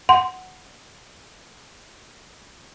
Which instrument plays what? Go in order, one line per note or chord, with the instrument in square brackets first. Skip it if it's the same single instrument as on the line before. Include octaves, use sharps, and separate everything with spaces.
[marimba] F#5 [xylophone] C6